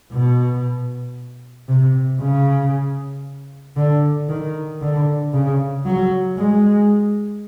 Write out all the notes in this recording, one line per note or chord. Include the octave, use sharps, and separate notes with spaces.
B2
C3
C#3
D3
D#3
D3
C#3
F#3
G#3